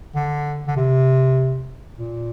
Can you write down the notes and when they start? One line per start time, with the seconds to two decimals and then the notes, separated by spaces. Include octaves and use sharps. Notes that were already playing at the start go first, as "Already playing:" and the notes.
0.15 D3
0.67 D3
0.77 C3
1.98 A#2